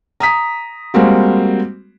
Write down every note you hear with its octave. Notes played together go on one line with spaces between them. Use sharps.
A#5 D#6 B6
G3 G#3 A#3 C4 F#4